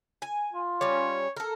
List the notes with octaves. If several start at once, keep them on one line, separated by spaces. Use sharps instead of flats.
G#5
F4
G3 C#4 C#5
A4 A#4